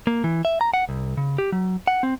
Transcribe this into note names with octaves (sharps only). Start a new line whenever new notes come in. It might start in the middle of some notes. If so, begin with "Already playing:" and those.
A#3
E3
E5
A#5
F#5
C2
C#3
G4
F#3
F#5
C4